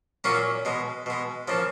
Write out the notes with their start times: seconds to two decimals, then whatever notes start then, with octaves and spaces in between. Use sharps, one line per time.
0.24 A#2 F#3 A#3 C#4
0.65 B2 G#3
1.06 B2 G#3
1.48 C#3 F3 A#3